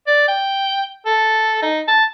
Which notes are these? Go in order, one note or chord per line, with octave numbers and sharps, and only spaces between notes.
D5
G5
A4
D#4
A5